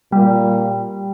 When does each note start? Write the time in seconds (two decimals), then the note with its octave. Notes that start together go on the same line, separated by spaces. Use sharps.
0.12 A#2 G3